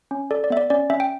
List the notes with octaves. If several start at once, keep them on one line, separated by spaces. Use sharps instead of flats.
C#4
A4 D5
D5
B3 E5
D5
C#4 D5
C#4 E5
G5